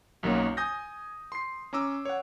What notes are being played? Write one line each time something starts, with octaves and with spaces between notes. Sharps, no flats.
B1 F#2 D#3 A#3 F#4 C#5
G#5 D#6 G6 A#6
C6 C7
C#4 A#5 D6 E6
C#5 F#5